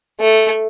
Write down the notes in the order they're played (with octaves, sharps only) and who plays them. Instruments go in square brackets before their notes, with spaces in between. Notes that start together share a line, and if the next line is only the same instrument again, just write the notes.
[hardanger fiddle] A3